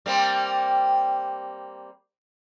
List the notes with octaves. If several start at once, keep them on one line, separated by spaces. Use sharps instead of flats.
G3 A#3 C4